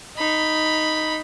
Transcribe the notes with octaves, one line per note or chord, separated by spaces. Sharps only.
D#4 B5